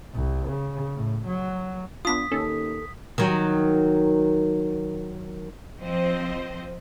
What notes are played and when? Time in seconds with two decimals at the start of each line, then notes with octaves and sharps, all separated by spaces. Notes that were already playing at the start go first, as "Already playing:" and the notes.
0.15 C2
0.48 C#3
0.96 A2
1.27 F#3
2.05 B3 D4 F4 D#6 B6
2.32 D#2 C#4 A4
3.18 D#3 F#3
5.81 F3 C4 C5 D#5